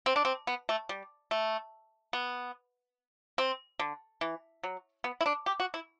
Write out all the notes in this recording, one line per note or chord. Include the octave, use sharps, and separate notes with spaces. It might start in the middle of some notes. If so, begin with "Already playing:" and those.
C4
D4
C4
B3
A3
G3
A3
B3
C4
D3
E3
F#3
B3
E4
D4
G4
F#4
E4